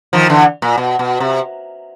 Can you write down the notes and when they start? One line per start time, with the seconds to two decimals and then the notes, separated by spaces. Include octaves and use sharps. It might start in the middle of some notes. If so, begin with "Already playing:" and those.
0.13 D#3 F3
0.29 D3 E3
0.62 A#2
0.78 B2
0.99 B2
1.20 C3